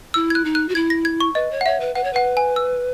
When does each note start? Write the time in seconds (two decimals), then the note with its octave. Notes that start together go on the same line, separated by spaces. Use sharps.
0.14 E4 E6
0.30 G#6
0.35 F#6
0.45 D#4
0.55 F#6
0.69 F#4
0.75 E4 G#6
0.90 A#6
1.05 G#6
1.20 C#6
1.35 B4 D#5
1.51 C#5
1.61 F#5
1.66 C#5 E5
1.80 B4
1.95 B4 F#5
2.04 C#5
2.13 B4 F#5
2.37 G#5
2.56 E6